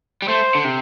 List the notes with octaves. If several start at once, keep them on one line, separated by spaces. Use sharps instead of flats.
G3
A3 C5
D3
C3